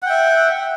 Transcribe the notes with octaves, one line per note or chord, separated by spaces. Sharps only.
E5 F#5 G5